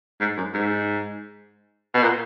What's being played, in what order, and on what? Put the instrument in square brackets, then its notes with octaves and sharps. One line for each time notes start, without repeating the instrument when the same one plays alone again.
[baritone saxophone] G#2
F#2
G#2
B2
A#2